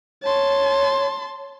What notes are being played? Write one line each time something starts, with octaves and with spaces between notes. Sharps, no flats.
C#5 A5 C6